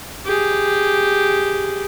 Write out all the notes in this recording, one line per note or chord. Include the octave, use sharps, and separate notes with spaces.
G4 G#4